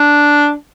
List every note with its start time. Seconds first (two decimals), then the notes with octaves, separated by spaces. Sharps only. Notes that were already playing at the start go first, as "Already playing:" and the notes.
Already playing: D4